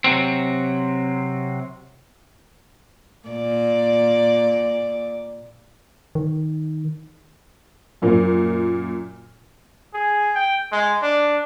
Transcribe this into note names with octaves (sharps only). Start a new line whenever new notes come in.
C3 F#3 C4
A#2 D5
D#3
F#2 A#2
G#4
G5
G#3
D4